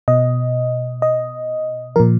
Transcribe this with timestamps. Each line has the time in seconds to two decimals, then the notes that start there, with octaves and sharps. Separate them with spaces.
0.08 B2 D#5
1.02 D#5
1.96 A#2 F3 A#4